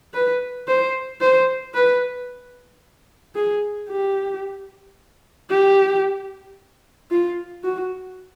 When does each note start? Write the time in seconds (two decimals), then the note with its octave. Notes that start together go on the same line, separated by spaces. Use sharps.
0.14 B4
0.67 C5
1.21 C5
1.74 B4
3.35 G#4
3.89 G4
5.50 G4
7.11 F4
7.64 F#4